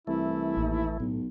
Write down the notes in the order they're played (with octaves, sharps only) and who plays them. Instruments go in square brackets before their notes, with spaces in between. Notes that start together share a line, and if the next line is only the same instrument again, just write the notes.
[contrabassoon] C2 [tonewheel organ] E3 A3 [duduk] E4
[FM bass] A1 [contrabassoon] D#2
[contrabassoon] B1 [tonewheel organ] A2